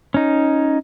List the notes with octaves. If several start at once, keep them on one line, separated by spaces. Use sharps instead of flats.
C#4 D#4